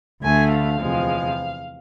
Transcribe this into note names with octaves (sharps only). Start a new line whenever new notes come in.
D2 D3 A3 G#5
F5
E2 C3 F3 G#3